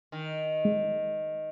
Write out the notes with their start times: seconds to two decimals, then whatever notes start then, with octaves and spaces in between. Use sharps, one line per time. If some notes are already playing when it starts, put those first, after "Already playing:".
0.12 D#3
0.65 G#3